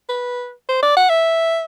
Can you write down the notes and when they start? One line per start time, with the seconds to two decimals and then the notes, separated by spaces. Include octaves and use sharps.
0.09 B4
0.69 C5
0.83 D5
0.97 F#5
1.09 E5